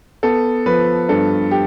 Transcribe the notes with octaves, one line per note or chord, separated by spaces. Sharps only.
B3 A4
F3 B4
G2 A4
G4